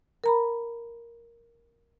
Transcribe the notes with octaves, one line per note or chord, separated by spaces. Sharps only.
A#4 A#5 B5